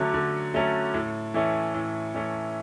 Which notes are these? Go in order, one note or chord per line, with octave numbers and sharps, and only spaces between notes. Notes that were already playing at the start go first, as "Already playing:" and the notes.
Already playing: D3 F#3 A3 C#4
D3
F#3 A3 C#4
A2
E3 A3 C#4
A2
E3 A3 C#4